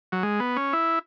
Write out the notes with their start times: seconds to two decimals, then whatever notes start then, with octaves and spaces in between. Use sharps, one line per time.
0.12 F#3
0.23 G#3
0.40 B3
0.56 C#4
0.73 E4